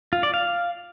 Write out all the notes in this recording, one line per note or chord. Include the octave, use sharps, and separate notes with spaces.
F4
D5
F5